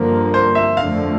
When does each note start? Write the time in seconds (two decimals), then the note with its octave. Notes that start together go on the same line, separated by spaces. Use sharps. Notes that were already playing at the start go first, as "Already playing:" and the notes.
Already playing: G2 D3 F3 A#3
0.34 C5
0.55 E5
0.76 F2 D3 F3 A3 F5